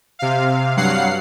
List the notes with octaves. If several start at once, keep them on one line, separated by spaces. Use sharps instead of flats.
C3 F5
G2 F#3 F5 F#5 C7